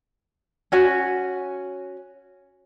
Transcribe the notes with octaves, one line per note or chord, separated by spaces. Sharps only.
C#4 F#4 G#5